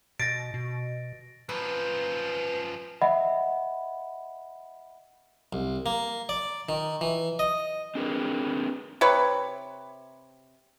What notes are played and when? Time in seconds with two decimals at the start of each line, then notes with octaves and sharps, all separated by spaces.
0.20 B2 A6 A#6 D7
0.54 B2
1.49 F#2 F3 B4
3.02 D#5 E5 F#5 B5
5.53 C2
5.86 A#3
6.29 D5
6.69 D#3
7.01 E3
7.39 D#5
7.95 C4 D4 G#4 A#4 B4
9.01 C3 B4 C#5